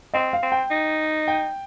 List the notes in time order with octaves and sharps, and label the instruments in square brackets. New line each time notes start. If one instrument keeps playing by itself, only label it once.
[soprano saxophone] C4 [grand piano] D#5
[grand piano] F5
[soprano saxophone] C4
[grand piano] G5
[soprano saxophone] D#4
[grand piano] G5